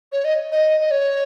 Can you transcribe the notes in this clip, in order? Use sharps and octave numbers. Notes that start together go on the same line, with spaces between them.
C#5
D#5
D#5
D#5
C#5